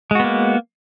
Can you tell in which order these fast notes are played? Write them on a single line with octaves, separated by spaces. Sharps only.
G#3 F#4 B3 A#3